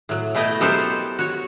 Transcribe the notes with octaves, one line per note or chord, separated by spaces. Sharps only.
A2 F#3
B2 A3 E4 D#5 G5
F#3 B3 G4 A4 A#4 C5
F#4 C#5